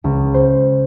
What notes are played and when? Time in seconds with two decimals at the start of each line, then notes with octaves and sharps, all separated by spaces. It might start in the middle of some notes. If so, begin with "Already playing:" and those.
0.04 C#2
0.34 C5